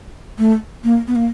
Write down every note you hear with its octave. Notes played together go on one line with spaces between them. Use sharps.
A3
A#3
B3
A#3